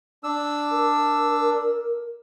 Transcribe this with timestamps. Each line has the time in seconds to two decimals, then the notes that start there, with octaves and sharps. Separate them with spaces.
0.24 D4 E6
0.72 A#4